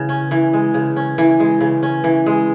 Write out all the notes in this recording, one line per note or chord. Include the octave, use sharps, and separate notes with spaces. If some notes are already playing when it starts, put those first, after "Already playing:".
Already playing: C#3 E3 G#3
C#4
E3
G#3
C#3
C#4
E3
G#3
C#3
C#4
E3
G#3